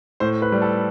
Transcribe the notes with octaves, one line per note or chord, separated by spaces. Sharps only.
A2 C5
B4
G3
A4